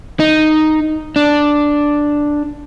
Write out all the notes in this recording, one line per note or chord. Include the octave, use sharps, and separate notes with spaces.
D#4
D4